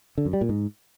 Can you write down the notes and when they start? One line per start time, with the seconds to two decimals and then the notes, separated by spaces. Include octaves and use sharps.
0.18 D3
0.25 F#2
0.33 G3
0.41 A#2
0.49 G#2